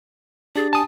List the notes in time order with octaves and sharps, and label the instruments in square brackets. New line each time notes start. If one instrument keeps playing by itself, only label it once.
[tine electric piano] D4 G4 A6 [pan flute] G#4
[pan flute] G#5 [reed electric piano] A5 D#6